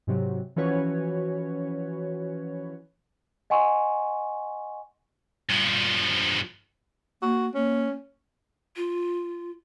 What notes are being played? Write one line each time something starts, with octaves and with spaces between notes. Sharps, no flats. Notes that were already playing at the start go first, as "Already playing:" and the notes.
G#2 C3 F#3
E3 F3 C#4 F#4 B4 C#5
D#5 F#5 G#5 C6 C#6
G2 F3
A#3 F#4
A#3 C#4
F4